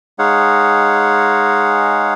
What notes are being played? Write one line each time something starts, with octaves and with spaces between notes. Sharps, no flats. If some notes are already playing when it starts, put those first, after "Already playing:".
G#3 D#4 G#4 C#5 F5 F#5